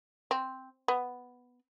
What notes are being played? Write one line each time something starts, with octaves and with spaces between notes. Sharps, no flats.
C4
B3